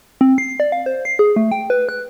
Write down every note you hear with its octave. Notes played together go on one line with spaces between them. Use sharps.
C4
C7
D5
F5
C5
C7
G#4
A3
G5
B4
F#6